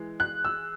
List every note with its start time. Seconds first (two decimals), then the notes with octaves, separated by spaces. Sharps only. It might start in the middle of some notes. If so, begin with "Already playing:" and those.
Already playing: E3 G#3
0.20 F#6
0.45 E6